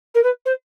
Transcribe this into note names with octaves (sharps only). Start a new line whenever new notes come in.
A#4
B4
C5